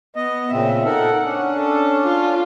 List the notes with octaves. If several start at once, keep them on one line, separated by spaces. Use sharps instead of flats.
B3 D#5
A#2 C#3 C4 E5
D#4 A4 A#4 F#5
C#4 D4
A4
F4